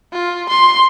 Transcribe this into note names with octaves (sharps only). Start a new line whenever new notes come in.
F4
C6